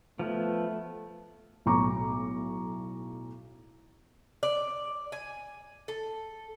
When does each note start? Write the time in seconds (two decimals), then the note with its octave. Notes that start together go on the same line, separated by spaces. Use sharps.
0.19 F3 A3 B3
1.66 B1 A2 A#5 C#6 D6
4.43 D5
5.12 G#5
5.88 A4